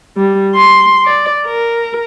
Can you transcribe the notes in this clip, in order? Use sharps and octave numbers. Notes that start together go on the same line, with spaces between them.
G3
C6
D5
A#4